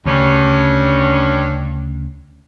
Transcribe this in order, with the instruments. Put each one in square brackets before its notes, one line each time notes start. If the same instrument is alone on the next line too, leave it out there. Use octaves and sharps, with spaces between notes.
[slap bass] D2 C#3 [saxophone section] G2 C#4